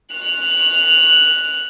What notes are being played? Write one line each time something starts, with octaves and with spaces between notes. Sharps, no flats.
F#6 F7